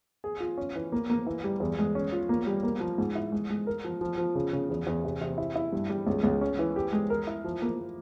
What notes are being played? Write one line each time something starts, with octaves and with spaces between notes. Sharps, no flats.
G#4
F4
C#4
E3
A#3
A#3
E3
G3
E2
G#3
C#4
F4
A#3
G3
A#3
F3
G#2
E4
G#3
G#3
A#4
F3
F3
F3
C#3
C#3
E2
E2
C3
C3
E4
E4
G2
G3
C#2
C#2
C#4
E3
G4
G#3
A#4
E4
F3
A#3